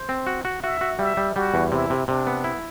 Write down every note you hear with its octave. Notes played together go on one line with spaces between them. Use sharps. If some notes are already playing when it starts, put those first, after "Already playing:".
Already playing: C5
C4
F#4
F#4
F#4 E5
F#4
G3 E5
G3
G3 F#4
E2
C3 E4
C3
C3 D4
B3
E4